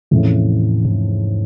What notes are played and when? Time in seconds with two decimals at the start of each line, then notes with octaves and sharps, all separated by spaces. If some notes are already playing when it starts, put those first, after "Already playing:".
0.11 E2 A2 C3 F3 A3 C#4
0.85 G#2